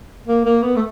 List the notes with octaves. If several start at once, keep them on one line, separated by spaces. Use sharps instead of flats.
A#3
A#3
B3
A3